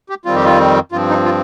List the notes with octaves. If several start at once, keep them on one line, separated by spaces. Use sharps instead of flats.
G4
F2 D#3 G3 C4 F4
G4
F4
G2 F3 C4 F4
D#4
F4